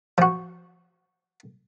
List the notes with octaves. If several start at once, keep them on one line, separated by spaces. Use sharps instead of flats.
F3 F#4